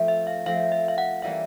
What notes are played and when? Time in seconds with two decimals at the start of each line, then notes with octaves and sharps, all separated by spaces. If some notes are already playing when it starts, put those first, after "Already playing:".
Already playing: F3 A3 C4
0.08 E5
0.27 F5
0.46 F3 A3 C4 F5
0.72 E5
0.88 F5
0.98 F#5
1.22 E3 G3 A#3 C#4 F5